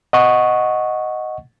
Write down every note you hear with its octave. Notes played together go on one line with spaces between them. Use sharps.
D#5 F#5 C#6